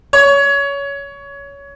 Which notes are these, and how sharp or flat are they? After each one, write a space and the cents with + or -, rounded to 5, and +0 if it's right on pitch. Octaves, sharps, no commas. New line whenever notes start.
C#5 +20